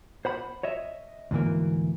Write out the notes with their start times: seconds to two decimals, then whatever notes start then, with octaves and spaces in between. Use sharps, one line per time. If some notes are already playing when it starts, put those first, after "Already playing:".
0.25 C5 F#5 B5
0.63 C#5 D#5 E5
1.31 D2 G#2 E3 A#3